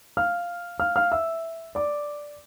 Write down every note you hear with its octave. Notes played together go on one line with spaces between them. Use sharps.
F5 F6
F5 F6
F5 F6
E5 E6
D5 D6